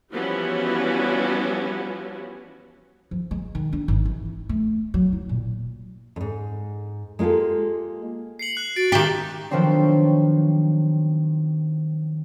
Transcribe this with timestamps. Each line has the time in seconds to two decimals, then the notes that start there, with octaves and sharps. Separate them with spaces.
0.13 E3 F3 G3 B3 C#4 F#4
3.11 F3
3.31 G#3
3.55 D#3
3.73 D4
3.88 G#1
4.05 E3
4.49 A3
4.94 F#3
5.13 E4
5.29 A#2
6.16 F2 G#2
7.19 G#3 A#3 F4 G4 A4
8.39 C7 C#7 F#7
8.57 F#6
8.76 F#4 A6 D7
8.92 D#3 G4 G7
9.51 D#3 F3 F#3 B3 C4 D4